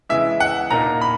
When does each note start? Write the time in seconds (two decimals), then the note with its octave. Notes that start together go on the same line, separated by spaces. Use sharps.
0.09 C#3 E3 G#3 E5
0.40 F#5
0.70 A#2 A#3 D#4 A#5
1.01 B5